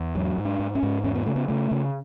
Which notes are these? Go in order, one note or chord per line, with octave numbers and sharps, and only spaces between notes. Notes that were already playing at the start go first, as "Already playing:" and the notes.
Already playing: E2
G#2 F#3
G#2
D4
G#2
C#4
G#2
E2 C#4
B3
C#3 A3
B3
C#3 A3
C#3